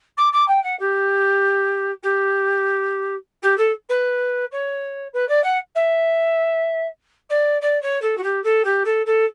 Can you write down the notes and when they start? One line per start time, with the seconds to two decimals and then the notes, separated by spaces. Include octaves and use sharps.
0.17 D6
0.32 D6
0.48 G5
0.63 F#5
0.79 G4
2.03 G4
3.42 G4
3.57 A4
3.89 B4
4.51 C#5
5.13 B4
5.28 D5
5.43 F#5
5.75 E5
7.29 D5
7.61 D5
7.82 C#5
8.01 A4
8.17 F#4
8.23 G4
8.43 A4
8.64 G4
8.85 A4
9.06 A4